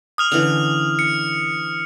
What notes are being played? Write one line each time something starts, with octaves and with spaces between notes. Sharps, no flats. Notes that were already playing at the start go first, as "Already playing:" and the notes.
D#6 F6 F7
D3 E3 C#4 F7
C#7